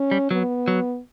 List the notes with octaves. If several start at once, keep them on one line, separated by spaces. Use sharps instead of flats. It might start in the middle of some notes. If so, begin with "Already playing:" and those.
Already playing: C#4
G3
F#3 B3
F#3